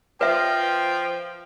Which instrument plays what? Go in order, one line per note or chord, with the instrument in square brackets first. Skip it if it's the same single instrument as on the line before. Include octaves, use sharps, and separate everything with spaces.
[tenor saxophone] F3 [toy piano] B4 E5 [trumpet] G5